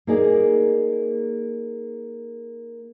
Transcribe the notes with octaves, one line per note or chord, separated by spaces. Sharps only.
A#3 D#4 G#4 D5